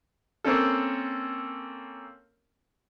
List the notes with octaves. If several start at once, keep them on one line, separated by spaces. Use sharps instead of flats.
A#3 C4 C#4 A4